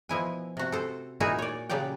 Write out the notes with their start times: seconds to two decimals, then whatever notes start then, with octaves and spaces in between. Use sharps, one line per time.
0.09 B2 F3 E4 G#5
0.57 C3 F#4
0.72 A4 C5
1.20 A#2 D#4 E4 F#4 G#4 E5
1.38 C#5 D5
1.69 C#3 F#3 G4 D5 G5